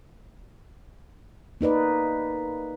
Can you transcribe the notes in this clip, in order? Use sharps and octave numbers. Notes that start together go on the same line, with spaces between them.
A#3 D#4 B4 D5